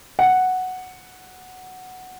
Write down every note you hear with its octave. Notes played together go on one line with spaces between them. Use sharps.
F#5